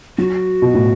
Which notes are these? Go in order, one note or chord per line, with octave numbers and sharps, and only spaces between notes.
F#3 F#4
B2
A2